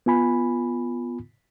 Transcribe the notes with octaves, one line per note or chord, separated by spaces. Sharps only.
B3 F4 G#5 B5